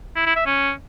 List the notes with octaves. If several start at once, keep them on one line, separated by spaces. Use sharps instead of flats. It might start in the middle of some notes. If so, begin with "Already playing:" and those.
E4
E4
E5
C#4